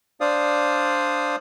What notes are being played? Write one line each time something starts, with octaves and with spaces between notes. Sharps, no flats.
D4 C5 D5 F5 D#6